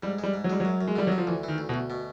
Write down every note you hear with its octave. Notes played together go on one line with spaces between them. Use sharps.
G#2 G3
G3 G#3
G#2
F#3
G3 G#3
F#3
F#2
F#2
G#3
D3 G3
D3 F#3
F3
D2 E3
D#3 E3
D2
B2
D2
B2